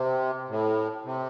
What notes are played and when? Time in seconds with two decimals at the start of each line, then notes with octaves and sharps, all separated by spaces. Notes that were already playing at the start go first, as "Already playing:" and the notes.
Already playing: C3
0.48 A2
1.05 C3